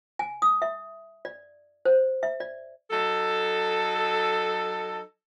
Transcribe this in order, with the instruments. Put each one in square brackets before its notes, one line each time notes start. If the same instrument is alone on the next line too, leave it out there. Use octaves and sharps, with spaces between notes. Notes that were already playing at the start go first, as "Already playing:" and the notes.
[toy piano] G#5
D#6
E5
D5
C5
E5
D5
[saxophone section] F#3 D#4 A4